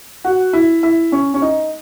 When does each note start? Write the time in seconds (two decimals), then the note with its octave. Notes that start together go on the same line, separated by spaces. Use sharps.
0.24 F#4
0.53 E4
0.83 E4
1.12 C#4
1.34 C#4
1.42 D#4